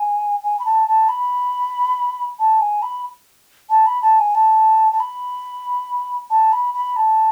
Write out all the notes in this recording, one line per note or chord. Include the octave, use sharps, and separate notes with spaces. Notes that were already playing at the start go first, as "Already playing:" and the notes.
Already playing: G#5
G#5
B5
A5
A5
B5
A5
G#5
B5
A5
B5
A5
G#5
A5
A5
B5
A5
B5
B5
A5